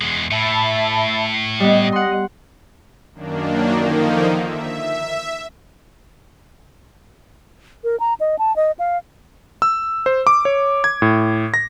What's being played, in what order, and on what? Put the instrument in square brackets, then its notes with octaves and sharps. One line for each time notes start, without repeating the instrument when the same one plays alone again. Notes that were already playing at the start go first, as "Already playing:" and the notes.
[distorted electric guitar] E2 G#3
[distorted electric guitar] A2 [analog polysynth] E5 A5 B5
[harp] G3 B3 [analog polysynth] D#5
[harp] F#5 C6
[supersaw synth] F#2 D#3 A#3 D4
D3 D#3 F3 A#3 D#4
E5
[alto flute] A#4
A#5
D#5
A5
D#5
F5
[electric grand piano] E6
C5
D6
C#5
G#6
A2
A#6